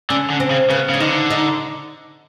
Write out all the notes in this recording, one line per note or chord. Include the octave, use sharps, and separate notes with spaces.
D3 C#4
D3
C4
C#3
C#3 B3
C#3 D4
D3 D#4
D#4